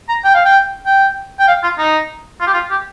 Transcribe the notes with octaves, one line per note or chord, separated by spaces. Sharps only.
A#5
G5
F5
G5
G5
G5
F5
F4
D#4
F4
G4
F4
G4